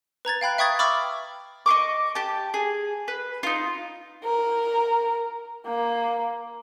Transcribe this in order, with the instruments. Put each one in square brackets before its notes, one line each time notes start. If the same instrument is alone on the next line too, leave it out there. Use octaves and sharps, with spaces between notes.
[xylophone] B4 A#5 G#6 A6
F5 G5 B5 F#6
E5 G5 C#6 D#6 G#6 A6
B5 C#6 D6 E6 F6 A6
[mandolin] D#5 F5 C#6 D6
G4 A5
G#4
B4
D#4 F4
[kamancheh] A#4
A#3